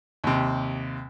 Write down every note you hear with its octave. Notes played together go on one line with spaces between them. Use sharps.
D#2 C3